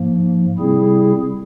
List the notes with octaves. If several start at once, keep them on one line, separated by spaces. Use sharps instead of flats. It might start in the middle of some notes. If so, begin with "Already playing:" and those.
Already playing: G#2 F3 A#3
C3 G3 C4 E4 G#4